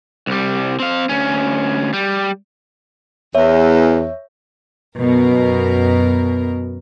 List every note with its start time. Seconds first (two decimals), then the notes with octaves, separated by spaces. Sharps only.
0.27 C2 G3
0.80 C4 F5
1.09 D2 C#4
1.93 G3
3.35 E2 C#5 E5
4.99 F#2 B2 A#4